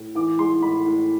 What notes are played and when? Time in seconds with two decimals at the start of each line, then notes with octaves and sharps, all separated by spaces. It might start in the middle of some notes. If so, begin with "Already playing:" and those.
Already playing: A2
0.15 E3 D6
0.39 G#3 C6
0.62 A2 B5
0.86 A2